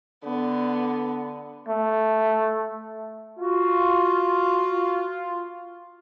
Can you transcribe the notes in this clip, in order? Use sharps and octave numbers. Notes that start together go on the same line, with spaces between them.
D3 B3
A3
F4 F#4